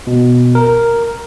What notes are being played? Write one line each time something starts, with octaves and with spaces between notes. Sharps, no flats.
B2
A#4